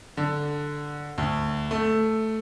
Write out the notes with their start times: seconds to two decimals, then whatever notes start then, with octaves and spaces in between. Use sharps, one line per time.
0.17 D3
1.18 D2
1.71 A3